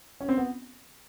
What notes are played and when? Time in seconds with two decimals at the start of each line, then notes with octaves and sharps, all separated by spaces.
0.21 C#4
0.29 C4
0.37 B3